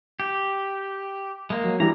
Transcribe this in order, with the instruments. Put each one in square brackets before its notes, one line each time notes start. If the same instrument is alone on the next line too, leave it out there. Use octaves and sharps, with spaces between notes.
[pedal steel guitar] G4
G#3 A#3
[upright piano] F#3
[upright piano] E3 G3 D4 [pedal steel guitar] A#5